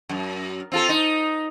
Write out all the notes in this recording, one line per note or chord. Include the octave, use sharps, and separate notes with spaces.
F#2
C4 F4 A4
D#4